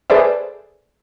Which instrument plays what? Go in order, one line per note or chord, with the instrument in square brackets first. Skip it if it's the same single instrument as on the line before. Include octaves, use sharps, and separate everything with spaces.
[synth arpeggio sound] G#4 A4 B4 C5 D5 E5